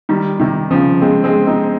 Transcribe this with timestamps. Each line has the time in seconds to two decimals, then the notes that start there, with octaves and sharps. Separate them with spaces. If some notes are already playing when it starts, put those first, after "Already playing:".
0.09 D#3 G3
0.40 C3 D#3
0.71 C#3 F3
1.01 G#3 C4
1.24 G#3 C4
1.47 C4 D#4